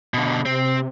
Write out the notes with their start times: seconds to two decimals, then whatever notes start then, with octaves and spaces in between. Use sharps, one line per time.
0.14 B2 D3
0.46 C3 C4